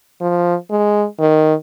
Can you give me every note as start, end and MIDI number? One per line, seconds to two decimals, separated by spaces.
0.21 0.55 53
0.71 1.06 56
1.20 1.54 51